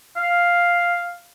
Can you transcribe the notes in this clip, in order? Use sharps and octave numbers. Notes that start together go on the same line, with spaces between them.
F5